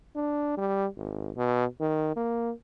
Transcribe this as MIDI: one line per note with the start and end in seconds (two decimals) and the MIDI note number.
0.16 0.57 62
0.57 0.86 55
0.96 1.31 32
1.36 1.65 47
1.80 2.12 51
2.16 2.52 58